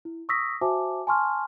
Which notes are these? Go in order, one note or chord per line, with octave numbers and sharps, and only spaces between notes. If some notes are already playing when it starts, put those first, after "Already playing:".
E4
C#6 D#6 E6 A#6 B6
F#4 C5 E5 G#5 A5 D6
G#5 A5 C6 C#6 F6